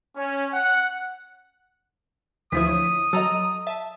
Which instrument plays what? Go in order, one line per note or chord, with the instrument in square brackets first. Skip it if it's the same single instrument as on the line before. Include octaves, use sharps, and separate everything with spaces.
[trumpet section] C#4
F#5
[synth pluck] D2 B6 [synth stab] E3 F3 E4 [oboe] D#6
[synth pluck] C#5
[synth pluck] F#3 D#5 [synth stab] A4 A#5
[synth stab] E5 A5